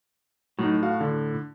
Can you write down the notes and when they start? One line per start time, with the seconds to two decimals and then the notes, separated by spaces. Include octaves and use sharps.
0.59 A2 F#3 D#4
0.83 F#4 F5
1.01 D3